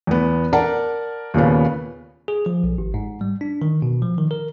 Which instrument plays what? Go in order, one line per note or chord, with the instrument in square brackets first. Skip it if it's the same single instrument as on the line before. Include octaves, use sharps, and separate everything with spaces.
[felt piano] E2 B3
A#4 D5 F#5 A5 A#5
D#2 A#2 C#3 B3
[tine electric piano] G#4
F3
B1
G#1
G#2
G3
D4
D#3
B2
F3
D#3
A#4